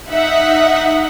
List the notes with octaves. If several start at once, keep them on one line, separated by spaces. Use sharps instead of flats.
D#4 E5 F#5